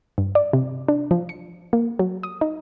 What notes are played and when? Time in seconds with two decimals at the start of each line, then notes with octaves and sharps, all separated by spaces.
0.18 G2
0.35 D5
0.53 C3
0.88 D4
1.11 F3
1.29 C#7
1.73 A#3
1.99 F#3
2.23 D#6
2.41 D#4